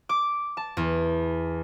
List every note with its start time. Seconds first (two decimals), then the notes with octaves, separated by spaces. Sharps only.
0.09 D6
0.57 A5
0.77 E2